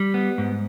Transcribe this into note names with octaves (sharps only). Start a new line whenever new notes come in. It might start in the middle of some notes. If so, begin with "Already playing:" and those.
Already playing: G3
B3
G#2